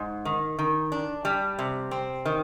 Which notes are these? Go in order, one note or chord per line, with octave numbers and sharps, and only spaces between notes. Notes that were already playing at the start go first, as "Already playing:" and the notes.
Already playing: G#2
D#3
D#3
D4
G3
C3
C4
D#3